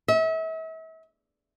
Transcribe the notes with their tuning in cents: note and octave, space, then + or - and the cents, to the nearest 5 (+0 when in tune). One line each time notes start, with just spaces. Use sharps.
E5 -40